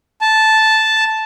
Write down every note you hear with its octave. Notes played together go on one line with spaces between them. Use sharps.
A5